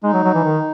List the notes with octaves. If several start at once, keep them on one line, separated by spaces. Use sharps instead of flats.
G#3 D#4
F#3
F#3
E3
D#3